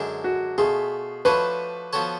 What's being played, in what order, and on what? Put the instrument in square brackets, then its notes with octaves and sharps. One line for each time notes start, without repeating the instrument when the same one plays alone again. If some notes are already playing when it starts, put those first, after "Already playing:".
Already playing: [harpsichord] F#2 D3 G#3 D4
[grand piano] F#4
[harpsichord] B2 A3 F4 [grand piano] G#4
[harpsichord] F3 A3 D4 F#4 C#5 [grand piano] B4
[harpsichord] F3 B3 F#4 A4 C#5